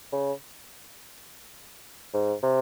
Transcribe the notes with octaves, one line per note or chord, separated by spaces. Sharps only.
C#3
G#2
C3